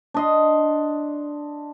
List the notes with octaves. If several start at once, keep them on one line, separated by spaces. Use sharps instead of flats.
D4 D#5 C6